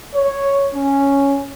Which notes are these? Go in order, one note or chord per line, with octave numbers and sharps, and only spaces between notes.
C#5
C#4